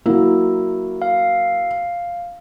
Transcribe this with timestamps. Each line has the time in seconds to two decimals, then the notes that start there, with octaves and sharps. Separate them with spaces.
0.06 F#3 A#3 E4
1.02 F5